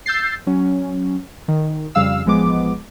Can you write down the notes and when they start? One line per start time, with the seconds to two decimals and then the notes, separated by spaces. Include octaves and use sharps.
0.06 E6 G6 A6 C7
0.47 F#3 C#4
1.48 D#3
1.95 F2 C#3 G3 F5 E6
2.25 A1 F3 G#3 B3 D6